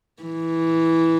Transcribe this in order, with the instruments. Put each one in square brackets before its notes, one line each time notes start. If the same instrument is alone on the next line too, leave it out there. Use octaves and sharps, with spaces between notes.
[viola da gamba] E3